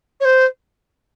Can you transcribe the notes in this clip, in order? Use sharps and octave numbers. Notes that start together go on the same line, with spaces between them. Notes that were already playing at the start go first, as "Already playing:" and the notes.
C#5
C5